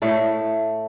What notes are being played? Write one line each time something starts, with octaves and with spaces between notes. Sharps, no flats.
A2 A3 A4